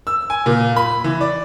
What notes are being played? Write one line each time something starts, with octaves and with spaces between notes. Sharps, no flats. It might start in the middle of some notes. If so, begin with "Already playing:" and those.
E6
G#5
A#2
B5
E3
D5